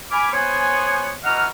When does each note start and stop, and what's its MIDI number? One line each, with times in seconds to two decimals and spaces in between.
0.11 0.33 80
0.11 0.33 83
0.11 0.33 86
0.11 0.33 89
0.33 1.15 59
0.33 1.15 72
0.33 1.15 73
0.33 1.15 80
1.24 1.45 47
1.24 1.45 52
1.24 1.45 75
1.24 1.45 78
1.24 1.45 82
1.24 1.45 89